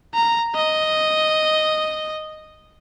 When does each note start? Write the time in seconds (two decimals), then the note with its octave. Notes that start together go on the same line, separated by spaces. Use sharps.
0.14 A#5
0.55 D#5